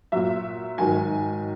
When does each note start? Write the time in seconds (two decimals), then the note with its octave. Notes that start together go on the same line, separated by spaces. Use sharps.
0.12 A#2 F#3 E5
0.78 G#2 D#3 F#3 G#5